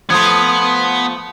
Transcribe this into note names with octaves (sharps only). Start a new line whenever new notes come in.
F3 A3 B3 C6 D#6 G#6